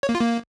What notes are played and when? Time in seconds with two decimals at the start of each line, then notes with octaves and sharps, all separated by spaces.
0.03 C#5
0.09 A#3
0.15 F4
0.20 A#3